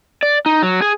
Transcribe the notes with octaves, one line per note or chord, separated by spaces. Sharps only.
D5
D#4
F#3
G#4